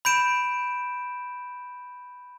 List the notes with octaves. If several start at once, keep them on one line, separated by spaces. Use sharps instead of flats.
B5 G6 D7 E7